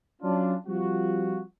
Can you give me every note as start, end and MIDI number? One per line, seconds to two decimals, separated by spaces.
0.22 0.54 54
0.22 0.54 61
0.22 0.54 62
0.22 0.54 65
0.67 1.41 53
0.67 1.41 55
0.67 1.41 60
0.67 1.41 65
0.67 1.41 66